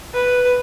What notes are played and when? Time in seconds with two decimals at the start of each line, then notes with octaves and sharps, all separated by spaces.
0.14 B4